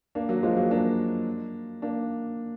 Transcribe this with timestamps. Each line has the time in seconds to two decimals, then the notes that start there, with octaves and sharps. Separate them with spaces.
0.15 A#3 D4
0.29 F#3 A#3
0.43 F3 G#3
0.57 F#3 A#3
0.71 A#3 D4
1.82 A#3 D4